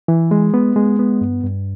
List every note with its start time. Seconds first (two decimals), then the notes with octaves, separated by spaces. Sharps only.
0.08 E3
0.31 G#3
0.54 B3
0.76 G#3
0.99 B3
1.21 G2
1.44 G2